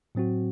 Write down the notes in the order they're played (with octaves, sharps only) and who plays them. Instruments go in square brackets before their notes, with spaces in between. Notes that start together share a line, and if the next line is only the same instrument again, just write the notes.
[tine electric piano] A2 F#3 C4 F#4